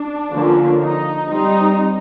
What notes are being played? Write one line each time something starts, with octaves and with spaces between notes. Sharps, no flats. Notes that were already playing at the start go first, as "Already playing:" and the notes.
Already playing: D4
D3 F3 A#3 C#4
D#4
G3 C4 D#4